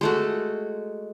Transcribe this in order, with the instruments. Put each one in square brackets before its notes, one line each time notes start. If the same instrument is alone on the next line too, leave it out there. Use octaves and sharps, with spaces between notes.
[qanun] G#3 A3 F#4